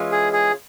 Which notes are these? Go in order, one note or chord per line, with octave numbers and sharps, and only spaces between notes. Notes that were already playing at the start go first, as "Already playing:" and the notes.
Already playing: E3 G#3 C#4 F4
G#4
G#4